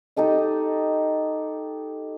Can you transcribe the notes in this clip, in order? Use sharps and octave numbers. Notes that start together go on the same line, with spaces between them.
D#4 G4 A4 D#5